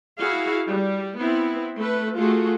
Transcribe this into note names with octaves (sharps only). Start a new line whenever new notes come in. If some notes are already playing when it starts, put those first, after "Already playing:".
E4 F#4 G#4 F5
G3
B3 C4 E4
A3 B4
A3 F4 F#4 G#4